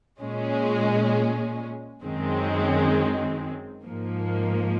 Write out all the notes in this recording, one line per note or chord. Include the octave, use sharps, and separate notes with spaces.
A#2 G#3 C#4
F#2 D#3 G#3 C4
G#2 F3 A#3